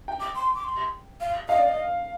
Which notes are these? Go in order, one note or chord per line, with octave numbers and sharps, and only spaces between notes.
G5
D6
C6
D6
C6
F5
D#5 F5
D5
D#5